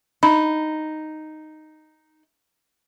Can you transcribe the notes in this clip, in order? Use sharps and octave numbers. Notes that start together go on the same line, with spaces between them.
D#4 B5